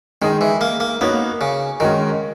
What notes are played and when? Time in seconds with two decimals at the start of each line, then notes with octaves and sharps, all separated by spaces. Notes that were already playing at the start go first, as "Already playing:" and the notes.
0.22 D#3 G#3 D#4 G#4 D#5
0.41 E3
0.61 A#3
0.80 A#3
1.01 A#3 B3 D#4 F#4 C#5
1.41 C#3
1.80 D#3 G#3 C#4 F#4 A#4